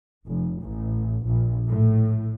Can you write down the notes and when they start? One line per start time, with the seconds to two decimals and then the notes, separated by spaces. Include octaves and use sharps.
0.26 F1
0.62 A1
1.25 A#1
1.67 A2